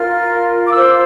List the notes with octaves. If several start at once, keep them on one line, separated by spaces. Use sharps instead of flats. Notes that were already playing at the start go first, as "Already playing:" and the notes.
Already playing: F4 A#4 F6
D6
F4 C5 E6